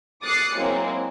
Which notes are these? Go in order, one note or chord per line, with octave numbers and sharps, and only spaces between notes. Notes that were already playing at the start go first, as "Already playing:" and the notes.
D6 D#6 F#6 A6 C7 C#7
F#3 G#3 A#3 C4 E4